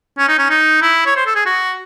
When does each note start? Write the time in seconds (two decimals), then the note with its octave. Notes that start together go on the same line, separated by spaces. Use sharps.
0.18 C#4
0.28 D#4
0.38 C#4
0.50 D#4
0.82 E4
1.06 C#5
1.16 C5
1.26 A4
1.35 G#4
1.46 F#4